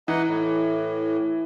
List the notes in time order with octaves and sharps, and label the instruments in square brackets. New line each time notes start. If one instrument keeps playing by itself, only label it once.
[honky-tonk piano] E3 [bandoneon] D#4 D#5 F#5
[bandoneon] A2